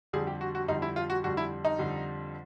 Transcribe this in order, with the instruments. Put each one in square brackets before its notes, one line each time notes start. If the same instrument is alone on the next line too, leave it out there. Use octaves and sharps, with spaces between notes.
[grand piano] F2 D3 G3 G#4
G4
F#4
F#4
F2 D3 G3 D#4
E4
F4
F#4
F2 D3 G3 F#4
E4
D#4
F2 D3 G3